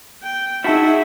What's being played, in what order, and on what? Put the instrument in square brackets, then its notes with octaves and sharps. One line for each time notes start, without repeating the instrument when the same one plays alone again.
[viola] G5
[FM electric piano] D#4 A5 B6 [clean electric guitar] E4 F#4 [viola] G#4 E5